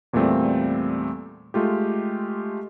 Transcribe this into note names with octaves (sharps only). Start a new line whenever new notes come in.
E2 A#2 G3 A3 C4
G#3 A3 F4 G4